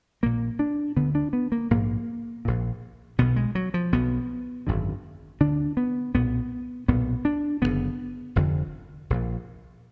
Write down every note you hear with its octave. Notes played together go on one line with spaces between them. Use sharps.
A#1 A#2 A#3
D4
D2 D3 B3
D4
B3
A#3
A#1 G#2 A#3
A#1 A#2
B1 B2 B3
G#3
F#3
F3
B1 B2 B3
G#1 F#2 D3
D2 D3 D4
B3
B1 A#2 B3
B1 A#2 B3
D4
F#1 F2 D3 B3
F1 F2 D3
A#1 A#2